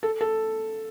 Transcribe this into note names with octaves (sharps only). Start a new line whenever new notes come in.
A4
A4